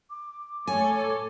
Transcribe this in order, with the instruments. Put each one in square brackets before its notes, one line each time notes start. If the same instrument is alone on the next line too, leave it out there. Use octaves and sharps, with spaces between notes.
[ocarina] D6
[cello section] A2 A4 C#5 [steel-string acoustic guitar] G#5